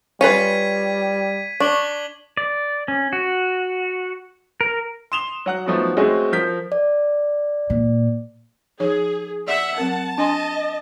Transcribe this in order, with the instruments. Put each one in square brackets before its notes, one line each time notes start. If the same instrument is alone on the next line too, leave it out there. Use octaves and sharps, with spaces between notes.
[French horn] G3 [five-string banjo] C#4 F4 B4 [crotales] G#6 B6 D#7
[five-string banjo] D4 [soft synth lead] C#6 [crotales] D6 F#7 G7
[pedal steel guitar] D5
C#4
F#4
A#4
[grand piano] C6 D#6 E7 F7 G7
F#3 F#5 F#6
F3 F#3 A3 B3 D#4 F#4
G#3 A3 C4 C#4 F#4 D#5
F3 A#4 G6 B6
[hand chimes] D5
[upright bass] A#2
[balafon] F3 D#4 C#5 [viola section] G#4
[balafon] D5 [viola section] E5 [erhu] F#5
[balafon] F#3 C4 A#4 [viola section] A5
[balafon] D4 G#5 C6 [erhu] D#5